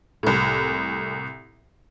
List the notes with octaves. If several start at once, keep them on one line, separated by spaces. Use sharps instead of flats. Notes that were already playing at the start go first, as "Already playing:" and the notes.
C2 A2